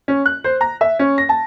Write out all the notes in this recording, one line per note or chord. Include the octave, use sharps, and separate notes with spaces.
C#4
F#6
C5
A#5
E5
C#4
A#6
A5